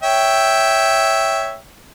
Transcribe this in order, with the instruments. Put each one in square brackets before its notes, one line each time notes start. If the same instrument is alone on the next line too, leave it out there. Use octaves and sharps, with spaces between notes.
[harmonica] C#5 E5 G5